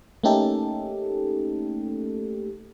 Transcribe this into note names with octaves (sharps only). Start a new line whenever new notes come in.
A3 A#3 C#4 D#4 G4 A4